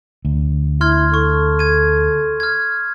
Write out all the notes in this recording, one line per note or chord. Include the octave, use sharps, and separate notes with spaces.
D2
E4 C6 F6 G#6
A4 C#6
G#6 D#7
F6 G#6